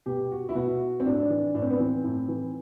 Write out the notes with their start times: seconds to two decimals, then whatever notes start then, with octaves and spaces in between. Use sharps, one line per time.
0.06 B2 G4
0.32 F#4
0.49 E4
0.55 B2 F#4
1.00 C4
1.06 A2 D4
1.30 E3
1.54 A2 D4
1.62 C4
1.70 B3
1.77 E3 C4
2.04 A2
2.28 E3